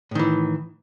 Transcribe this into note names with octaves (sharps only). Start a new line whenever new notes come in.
A2 D#3 E3